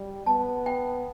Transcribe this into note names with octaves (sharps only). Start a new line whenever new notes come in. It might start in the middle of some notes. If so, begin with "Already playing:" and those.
Already playing: G3
B3 A5
G5